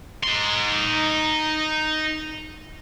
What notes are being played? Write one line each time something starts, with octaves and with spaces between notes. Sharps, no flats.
D#4 C6